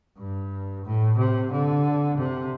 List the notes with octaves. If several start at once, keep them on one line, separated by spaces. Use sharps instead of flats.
G2
A2
C3
D3
C3